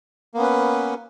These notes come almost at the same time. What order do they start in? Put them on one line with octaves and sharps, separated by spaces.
A#3 B3 C#4 B4